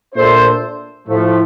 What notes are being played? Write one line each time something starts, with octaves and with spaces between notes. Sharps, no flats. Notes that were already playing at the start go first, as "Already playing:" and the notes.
A#2 A3 D4 A4 C5
A2 F3 A3